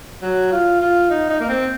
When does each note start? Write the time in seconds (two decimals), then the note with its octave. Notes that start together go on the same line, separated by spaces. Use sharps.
0.22 F#3
0.52 F4
0.81 F4
1.10 D#4
1.30 D#4
1.40 A#3
1.49 C4